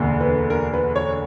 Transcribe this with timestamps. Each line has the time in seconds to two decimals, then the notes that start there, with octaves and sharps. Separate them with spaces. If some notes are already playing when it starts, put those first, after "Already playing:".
Already playing: E1 D2 D3 A#3
0.21 B4
0.50 A#4
0.74 B4
0.96 C#5